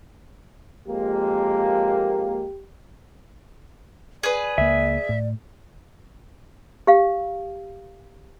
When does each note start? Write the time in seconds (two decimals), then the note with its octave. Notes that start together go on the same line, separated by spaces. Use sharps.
0.88 F2 G#3 A#3 G4
4.23 G#4 B4 D5
4.58 C#2 A#3 E5
5.09 A2
6.87 G4 F5